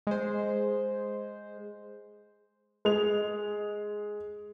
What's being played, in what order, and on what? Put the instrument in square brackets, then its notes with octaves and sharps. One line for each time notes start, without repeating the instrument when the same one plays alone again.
[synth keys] G#3 C5
[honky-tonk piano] G#3 F7